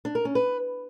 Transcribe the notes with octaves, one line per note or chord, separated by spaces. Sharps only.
D4
A#4
C#4
B4